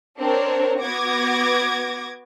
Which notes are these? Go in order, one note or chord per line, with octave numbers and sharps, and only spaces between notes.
C4 D4 A#4 C#5
B3 F#4 D6 G#6 A#6